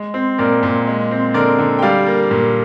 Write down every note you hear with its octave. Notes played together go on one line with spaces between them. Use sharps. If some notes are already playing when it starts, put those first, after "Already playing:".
Already playing: G#3
C4
A#2 A#4 D5
A#2
G#3
C4
D3 A#4 D5
D3
G5
G3 D5 F5
A#3
A#2